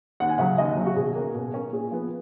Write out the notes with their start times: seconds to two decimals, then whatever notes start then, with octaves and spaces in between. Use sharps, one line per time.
0.20 D#2 F#5
0.29 G#5
0.38 C#3 F#3 F#5
0.58 D#2 D#5
0.77 C#3 F#3
0.87 F#4
0.96 B2 G#4
1.15 A#3 C#4
1.35 B2
1.54 A#3 C#4
1.72 A#2 G#4
1.91 F3 B3